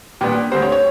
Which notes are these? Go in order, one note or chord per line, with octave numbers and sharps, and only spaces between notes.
A#2 G3 B3 D4 G4
D2 D3 G3 C4 C5
C#5
C#5